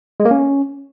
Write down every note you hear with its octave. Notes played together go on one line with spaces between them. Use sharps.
G#3
A#3
C#4